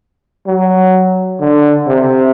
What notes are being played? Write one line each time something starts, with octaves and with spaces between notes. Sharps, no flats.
F#3
D3
C3